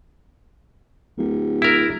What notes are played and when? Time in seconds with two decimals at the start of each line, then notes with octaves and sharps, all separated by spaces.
1.17 D1
1.62 E4 A#4